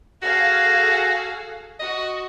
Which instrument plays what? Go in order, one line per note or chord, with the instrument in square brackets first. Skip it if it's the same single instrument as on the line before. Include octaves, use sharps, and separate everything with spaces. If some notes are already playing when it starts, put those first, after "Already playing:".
[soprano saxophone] F#4 [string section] G#4 A4 F5
[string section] F#4 [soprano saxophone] D#5